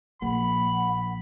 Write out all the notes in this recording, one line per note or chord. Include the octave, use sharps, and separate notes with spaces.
A#1 A#3 F#5 B5